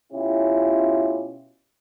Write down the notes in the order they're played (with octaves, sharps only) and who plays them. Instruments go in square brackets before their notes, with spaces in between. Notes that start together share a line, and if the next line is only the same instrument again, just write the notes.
[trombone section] B2 C#4 E4 F4 G4